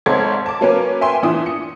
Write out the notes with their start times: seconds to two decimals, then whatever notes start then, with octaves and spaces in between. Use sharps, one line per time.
0.06 G#1 G#2 A4 C#5 G#6
0.46 A5 D6
0.61 F#3 A#3 C#4 A#4 B4
1.01 E5 G5 G#5 C6
1.22 A#2 E3 D4 E5 D#6
1.46 C#7